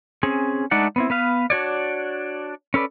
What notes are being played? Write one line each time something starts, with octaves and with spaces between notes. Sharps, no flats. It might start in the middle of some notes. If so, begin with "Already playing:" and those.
C4 C#4 G#4
G#3 A3 D4 D#4 D5 F#5
B3 C4 E4
B3 B4 F5
D4 F#4 C#5 D5
C#4 A4 B4 D5